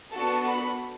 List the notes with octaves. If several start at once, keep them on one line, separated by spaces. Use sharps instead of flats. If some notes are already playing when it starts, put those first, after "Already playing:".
B3 D4 F#4 A4 A5
B5